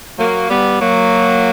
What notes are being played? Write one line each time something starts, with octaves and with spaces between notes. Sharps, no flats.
F#3 A#3
G3 B3
F#3 A#3